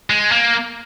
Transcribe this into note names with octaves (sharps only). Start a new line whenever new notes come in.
G#3
A#3